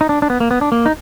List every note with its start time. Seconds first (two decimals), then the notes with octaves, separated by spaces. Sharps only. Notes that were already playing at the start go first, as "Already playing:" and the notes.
0.01 D#4
0.09 D4
0.22 D4
0.30 B3
0.40 A#3
0.51 B3
0.61 D4
0.72 A#3
0.86 D#4